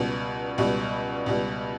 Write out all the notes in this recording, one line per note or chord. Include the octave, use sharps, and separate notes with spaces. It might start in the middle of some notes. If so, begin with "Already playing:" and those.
Already playing: C#2 B2 G3
C#2 B2 G3
C#2 B2 G3